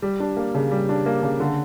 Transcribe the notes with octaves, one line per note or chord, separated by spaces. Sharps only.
G3
D4
A#3
C#3
G3
D4
A#3
C#3
D3